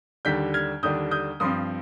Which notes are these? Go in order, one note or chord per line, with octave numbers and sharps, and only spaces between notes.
D#2 D3 G3 D4 G6 B6
F6 G#6
D#2 D3 G3 D4 D#6 G6
D#6 G6
G2 F3 C4 C6 D#6